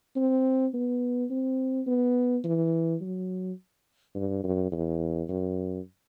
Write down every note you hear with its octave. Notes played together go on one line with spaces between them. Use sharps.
C4
B3
C4
B3
E3
F#3
G2
F#2
E2
F#2